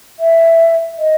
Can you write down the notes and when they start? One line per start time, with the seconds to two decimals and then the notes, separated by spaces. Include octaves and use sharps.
0.20 E5
0.99 D#5